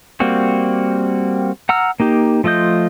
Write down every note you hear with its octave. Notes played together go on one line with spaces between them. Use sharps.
G3 A#3 C4 F#4
F#5 A#5 E6 F6
A#3 D#4 G4
F3 A3 F4 D#5 G6